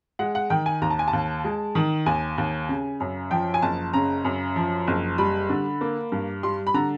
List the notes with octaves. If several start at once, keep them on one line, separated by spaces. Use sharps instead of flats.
G#3 F#5
F#5
D#3 G5
G#5
D#2 A#5
A5
G#5
A5
D#2
G#3
D#3
D#2 G#5
D#2
C#3
F#2
F3 G5
G#5
F#1 A5
C#3 A#5
F#2
F3
F#1
G3 B5
D3
A#3
G2
G3 C6
B5
D3 A#5